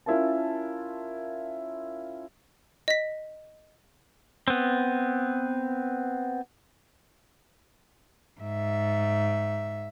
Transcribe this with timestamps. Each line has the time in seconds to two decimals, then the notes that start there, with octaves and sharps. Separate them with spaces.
0.06 C#4 E4 F4 A#4 A5
2.88 D#5 B6
4.48 B3 C4
8.41 G#2 E5